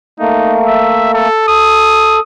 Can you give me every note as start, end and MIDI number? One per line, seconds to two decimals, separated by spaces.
0.20 1.28 57
0.20 1.28 58
0.20 0.57 63
0.66 1.11 76
1.14 1.46 69
1.48 2.20 69
1.48 2.22 87